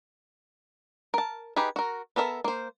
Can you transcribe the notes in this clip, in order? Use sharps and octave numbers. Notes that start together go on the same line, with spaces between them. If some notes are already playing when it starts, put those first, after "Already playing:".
A#4 A5
D#4 G4 G#4 B4
F#4 A#4
B3 A4 A#4 E5
A#3 C5